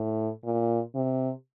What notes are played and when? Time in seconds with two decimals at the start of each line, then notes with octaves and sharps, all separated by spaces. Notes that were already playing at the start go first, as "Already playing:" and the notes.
Already playing: A2
0.44 A#2
0.95 C3